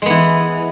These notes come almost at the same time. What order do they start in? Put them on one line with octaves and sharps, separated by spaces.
G#3 B3 E3